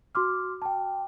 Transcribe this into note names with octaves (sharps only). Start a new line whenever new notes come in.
F#4 C6 D6 F6
G5 A5